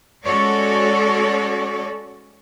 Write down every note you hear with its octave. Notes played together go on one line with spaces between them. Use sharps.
G#3 C#4 F#4 A4 C#5 D5